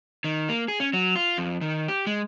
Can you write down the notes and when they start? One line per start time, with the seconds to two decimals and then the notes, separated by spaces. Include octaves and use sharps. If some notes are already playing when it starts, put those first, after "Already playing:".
0.24 D#3
0.49 A#3
0.68 G#4
0.80 C#4
0.93 F#3
1.16 F4
1.38 F2
1.61 D#3
1.88 G4
2.07 G#3